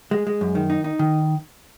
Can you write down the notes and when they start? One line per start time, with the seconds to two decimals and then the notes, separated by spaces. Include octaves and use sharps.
0.11 G#3
0.27 G#3
0.41 F#2
0.55 D#3
0.70 D#4
0.84 D#4
0.99 D#3